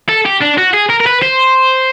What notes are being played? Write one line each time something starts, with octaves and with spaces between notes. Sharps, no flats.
A4
G4
D4
F#4
G#4
A#4
A#4
B4
C5